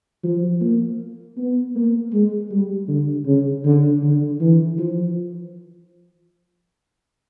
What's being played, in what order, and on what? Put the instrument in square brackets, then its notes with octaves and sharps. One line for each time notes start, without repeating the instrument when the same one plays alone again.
[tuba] F3
A#3
B3
A#3
G#3
G3
D3
C#3
D3
D3
E3
F3